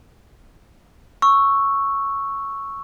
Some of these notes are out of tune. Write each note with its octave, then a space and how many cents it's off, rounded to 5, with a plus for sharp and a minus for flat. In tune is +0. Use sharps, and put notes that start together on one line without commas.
C#6 +0 E6 +0